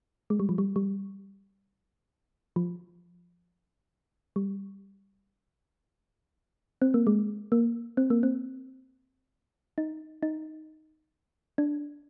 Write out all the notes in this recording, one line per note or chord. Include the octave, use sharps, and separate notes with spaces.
G#3
G3
F3
G3
G3
F3
G3
C4
A#3
G#3
A#3
C4
A#3
C4
D#4
D#4
D4